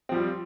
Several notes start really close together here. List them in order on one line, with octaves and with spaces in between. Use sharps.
C4 F3 G3